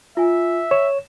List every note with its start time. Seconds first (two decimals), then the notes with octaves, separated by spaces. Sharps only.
0.17 F4 E5 G#5
0.71 C#5 E7